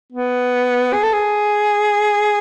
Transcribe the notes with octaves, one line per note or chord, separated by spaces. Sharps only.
B3
G#4
A4
G#4